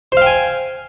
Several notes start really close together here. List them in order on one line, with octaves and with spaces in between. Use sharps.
C5 F5 G5 G#5